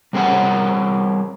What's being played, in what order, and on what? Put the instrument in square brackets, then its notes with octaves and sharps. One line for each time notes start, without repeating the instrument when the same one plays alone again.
[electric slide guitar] G3 C4 G#4 A#4 C#5 F#5